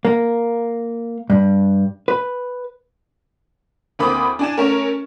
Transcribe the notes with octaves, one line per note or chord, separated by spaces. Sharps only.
A#3
G2
B4
D2 A#3 C4 B5 D6 D#6
D4 G#5 E7
A3 C#4 A#4